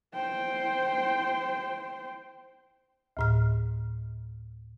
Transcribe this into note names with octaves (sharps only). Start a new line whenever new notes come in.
C5 G5
D2 A2 F6